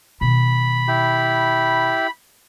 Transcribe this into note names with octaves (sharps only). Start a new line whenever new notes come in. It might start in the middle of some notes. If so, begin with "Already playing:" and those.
B2 D#3 B5
E4 G4